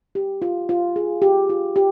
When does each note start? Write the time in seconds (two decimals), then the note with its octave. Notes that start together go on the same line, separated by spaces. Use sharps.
0.15 G4
0.42 F4
0.69 F4
0.96 G#4
1.22 G4
1.49 F4
1.76 G4